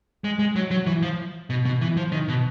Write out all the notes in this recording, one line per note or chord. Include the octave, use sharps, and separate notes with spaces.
G#3
G#3
F#3
F#3
E3
F3
B2
B2
E3
F3
D#3
B2